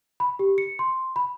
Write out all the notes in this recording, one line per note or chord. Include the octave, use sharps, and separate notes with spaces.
B5
G4
C#7
C6
B5